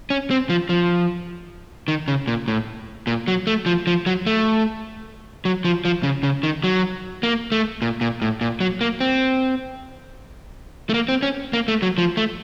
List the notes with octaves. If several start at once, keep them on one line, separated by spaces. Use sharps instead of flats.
C#4
C4
F3
F3
D#3
C#3
A#2
A2
A#2
F#3
A3
F3
F3
F#3
A3
F#3
F3
F3
C#3
C#3
D#3
F#3
A#3
A3
A#2
A#2
A2
A#2
F#3
A#3
C4
A3
A#3
C4
C#4
A#3
A3
F#3
F3
A3